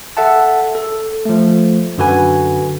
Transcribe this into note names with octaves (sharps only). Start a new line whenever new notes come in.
A4 E5 F#5 A5
A4
F3 A3
F#2 D3 F#4 B4 G#5